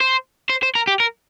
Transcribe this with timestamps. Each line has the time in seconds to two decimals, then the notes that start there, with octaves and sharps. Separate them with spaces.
0.01 C5
0.50 C5
0.63 C5
0.75 A#4
0.87 G4
1.00 A#4